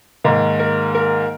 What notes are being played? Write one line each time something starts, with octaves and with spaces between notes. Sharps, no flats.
G#2 D#3 A#3
A#4
A#4